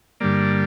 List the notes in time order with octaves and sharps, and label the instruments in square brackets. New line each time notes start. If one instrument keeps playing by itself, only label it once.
[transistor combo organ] G2 D3 G3 A#3 D5